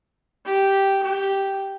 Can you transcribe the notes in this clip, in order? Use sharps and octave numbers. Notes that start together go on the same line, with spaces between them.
G4
G4